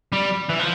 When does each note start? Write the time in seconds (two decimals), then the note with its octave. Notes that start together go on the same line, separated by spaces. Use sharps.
0.13 G3
0.50 E3
0.59 F3